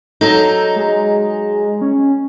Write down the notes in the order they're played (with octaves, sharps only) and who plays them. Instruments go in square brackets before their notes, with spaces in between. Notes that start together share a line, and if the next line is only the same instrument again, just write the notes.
[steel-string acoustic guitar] F#3 D#4 [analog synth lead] A4
[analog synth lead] G#3
C#4